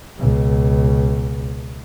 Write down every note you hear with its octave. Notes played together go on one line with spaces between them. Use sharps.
C#2 B2